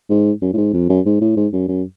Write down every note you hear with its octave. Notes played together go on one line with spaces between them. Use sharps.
G#2
F#2
A2
G#2
F2
F#2
G#2
A2
G#2
F#2
F#2